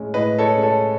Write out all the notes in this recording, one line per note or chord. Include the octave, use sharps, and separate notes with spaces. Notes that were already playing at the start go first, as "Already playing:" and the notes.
Already playing: A2 G#3 C#4
A2 B4 D#5
A4 C#5
G#3 C#4
A4 C#5